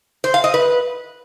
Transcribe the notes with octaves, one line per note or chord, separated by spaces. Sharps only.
C5
F5
D#5
B4